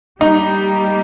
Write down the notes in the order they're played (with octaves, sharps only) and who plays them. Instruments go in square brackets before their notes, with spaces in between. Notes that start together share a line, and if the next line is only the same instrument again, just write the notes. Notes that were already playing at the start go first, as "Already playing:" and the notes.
[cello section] G3 A#3 G4 [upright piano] D#4